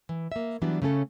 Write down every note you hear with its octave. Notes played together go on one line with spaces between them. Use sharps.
E3
A#3 E5
E3 F#3 G3 B3 D4
C#3 A3 C#4 A4